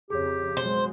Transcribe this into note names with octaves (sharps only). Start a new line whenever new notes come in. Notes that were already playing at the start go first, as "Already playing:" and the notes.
F2 C#3 G4 G#4 C#5
B2 F#3 G#3 C5